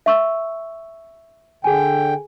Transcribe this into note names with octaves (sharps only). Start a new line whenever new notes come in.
E5 C#6 E6
D3 G#4 G5 G#5